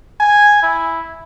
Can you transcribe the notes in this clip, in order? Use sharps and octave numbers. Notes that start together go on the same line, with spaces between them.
G#5
E4